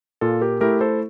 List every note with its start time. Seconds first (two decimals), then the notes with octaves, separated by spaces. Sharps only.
0.21 A#2 F4 A4
0.41 G4 A#4
0.61 A3 E4 G4 A#4
0.81 A4 C5